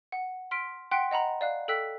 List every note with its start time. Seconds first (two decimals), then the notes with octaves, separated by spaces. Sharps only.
0.12 F#5
0.51 C6 F6 B6 D7
0.91 F#5 G5 C6 F#6 B6 D7
1.11 D#5 F#5 A#5 B5
1.41 D5 F5 F#6
1.68 A4 G5 E6 F#6 B6